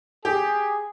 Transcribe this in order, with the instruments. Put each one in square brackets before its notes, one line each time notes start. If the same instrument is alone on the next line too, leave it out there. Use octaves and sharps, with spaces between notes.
[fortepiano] G4 [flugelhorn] G#4